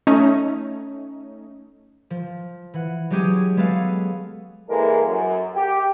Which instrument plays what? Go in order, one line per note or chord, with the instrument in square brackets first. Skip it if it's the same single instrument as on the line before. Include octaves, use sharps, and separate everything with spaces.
[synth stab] A3 C#4 D#4
[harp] F3
E3 F#5
F#3 G#3 C#4 G4 G#4
G#3 B3 G#4 A4 F5
[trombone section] C2 E3 G#3 A#3 A4 A#4
F#2 F#3
G4